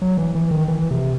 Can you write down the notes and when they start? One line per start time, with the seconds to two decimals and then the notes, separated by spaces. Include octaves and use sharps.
0.02 F#3
0.17 E3
0.35 E3
0.51 D#3
0.68 E3
0.91 C3